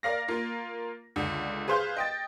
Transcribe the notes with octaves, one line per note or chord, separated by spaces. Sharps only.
A#4 D5 F5 A#6
A#3 F4
C#2 D3
G#4 B4 C5 F5 G6
D#5 G5 A6